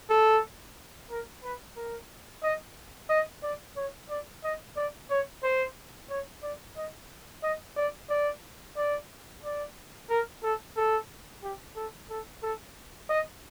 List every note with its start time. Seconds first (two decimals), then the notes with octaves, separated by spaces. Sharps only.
0.10 A4
1.10 A#4
1.43 B4
1.76 A#4
2.43 D#5
3.10 D#5
3.43 D5
3.76 C#5
4.09 D5
4.43 D#5
4.76 D5
5.10 C#5
5.43 C5
6.10 C#5
6.42 D5
6.76 D#5
7.43 D#5
7.77 D5
8.10 D5
8.76 D5
9.43 D5
10.10 A#4
10.43 A4
10.77 A4
11.43 G4
11.76 A4
12.10 A4
12.43 A4
13.09 D#5